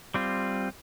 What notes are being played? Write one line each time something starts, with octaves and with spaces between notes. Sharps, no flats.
G3 C4 F4